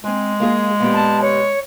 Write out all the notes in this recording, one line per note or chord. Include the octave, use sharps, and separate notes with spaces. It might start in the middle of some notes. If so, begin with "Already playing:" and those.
G#3 C4 G#5
A#3 F4 G#4
A#2 B3 G4
A5
C#5